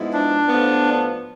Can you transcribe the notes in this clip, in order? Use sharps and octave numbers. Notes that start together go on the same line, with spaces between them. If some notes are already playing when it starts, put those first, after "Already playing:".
Already playing: G#2 F3 G#3 B3 E4
D4
A2 F3 B3